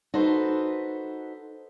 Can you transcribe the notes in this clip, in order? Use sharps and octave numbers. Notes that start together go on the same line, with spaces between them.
D#4 F#4 A4 B4 C5